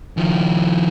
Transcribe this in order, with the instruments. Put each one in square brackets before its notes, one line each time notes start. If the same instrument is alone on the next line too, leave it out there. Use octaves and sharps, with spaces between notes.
[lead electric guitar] D#3 F3